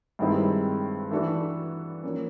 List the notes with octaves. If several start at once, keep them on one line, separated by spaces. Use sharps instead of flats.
G2 D#3 G#3 C4 E4
E3 A3 D4 F#4 A4
F3 A#3 C#4